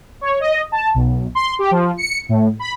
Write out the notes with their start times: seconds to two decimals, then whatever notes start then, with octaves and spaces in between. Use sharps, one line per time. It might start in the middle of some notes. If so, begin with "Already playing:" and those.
0.21 C#5
0.40 D#5
0.72 A5
0.94 B1
1.35 C6
1.59 G4
1.71 F3
1.97 C#7
2.29 A2
2.60 B5